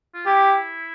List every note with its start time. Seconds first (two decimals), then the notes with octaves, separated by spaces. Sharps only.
0.15 F4
0.26 E4 G4